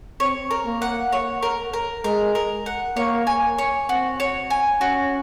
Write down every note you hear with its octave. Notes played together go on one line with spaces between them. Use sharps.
C4 C#5
A#4
A#3
F#5
C#5
A#4
A#4
G#3 A#4
A#4
F#5
A#3 C#5
G#5
C#5
C4 F#4
C#5
G#5
C#4 F#4